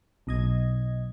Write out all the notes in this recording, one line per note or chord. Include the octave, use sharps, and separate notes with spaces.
B1 D#5 G#6